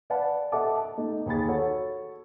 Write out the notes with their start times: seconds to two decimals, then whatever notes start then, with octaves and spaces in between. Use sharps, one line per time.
0.10 B4 D5 F5 F#5 A5 B5
0.52 A4 D#5 E5 F#5 A5 D6
0.77 A5
0.97 A3 D#4 D#5
1.26 D#2 G#4 B5 A6
1.48 F#4 A4 C#5